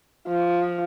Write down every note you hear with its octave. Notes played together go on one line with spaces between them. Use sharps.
F3